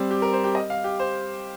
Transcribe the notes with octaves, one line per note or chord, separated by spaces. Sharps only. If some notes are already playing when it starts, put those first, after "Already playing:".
Already playing: G3 C4
G4
A#4
C5
G4
D#5
F5
G4
C5